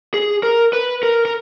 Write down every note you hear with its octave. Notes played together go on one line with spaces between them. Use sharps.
G#4
A#4
B4
A#4
A#4